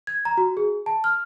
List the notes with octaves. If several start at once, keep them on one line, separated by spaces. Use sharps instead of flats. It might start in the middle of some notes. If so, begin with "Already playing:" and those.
G#6
A#5
F#4
G#4
A5
F6